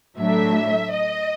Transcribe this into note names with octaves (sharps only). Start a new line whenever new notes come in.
A2 F#3 A3 D4 E5
D#5